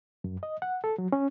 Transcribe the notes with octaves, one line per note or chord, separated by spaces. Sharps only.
F#2
D#5
F#5
A4
F#3
C#4